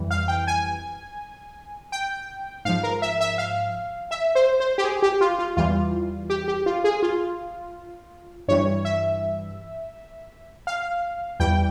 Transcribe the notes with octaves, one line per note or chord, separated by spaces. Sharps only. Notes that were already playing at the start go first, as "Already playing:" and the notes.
Already playing: F2 E3 G3
F5
G5
G#5
G5
G#2 F3 F5
A#4
E5
E5
F5
E5
C5
C5
G4
G#4
G4
F4
F4
E2 E3 G3 F4
G4
G4
F4
G#4
F4
G2 E3 G3 C#5
E5
F5
E2 E3 G3 G5